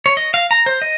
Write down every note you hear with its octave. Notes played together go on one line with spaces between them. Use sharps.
C#5
D#5
F5
A#5
C5
D#5